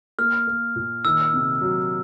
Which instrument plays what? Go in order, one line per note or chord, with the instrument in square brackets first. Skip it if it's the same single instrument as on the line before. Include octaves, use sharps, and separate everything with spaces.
[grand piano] A#3 [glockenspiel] F6
[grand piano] A#3
A#2
[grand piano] D#3 [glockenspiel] E6
[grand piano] C3
F#3